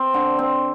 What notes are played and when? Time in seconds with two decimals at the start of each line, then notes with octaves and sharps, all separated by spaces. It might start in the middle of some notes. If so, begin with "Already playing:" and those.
Already playing: C4
0.14 D3
0.39 C4